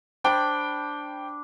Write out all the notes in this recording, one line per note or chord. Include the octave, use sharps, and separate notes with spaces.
D4 C5 G5 B5